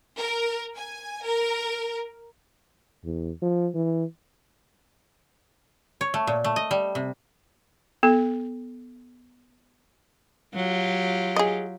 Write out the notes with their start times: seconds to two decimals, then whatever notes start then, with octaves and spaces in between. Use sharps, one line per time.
0.17 A#4
0.77 G#5
1.25 A#4
3.05 E2
3.42 F3
3.75 E3
6.01 C#5
6.14 A3
6.27 A#2
6.44 A3
6.56 D#5
6.71 G3
6.95 C3
8.03 B3 A4
10.54 F#3 F4 G4
11.36 G#4 D#5